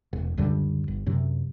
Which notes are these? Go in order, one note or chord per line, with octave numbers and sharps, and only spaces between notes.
E1
C#2 F#2 D3 G3
G1
F#2 C3 F#3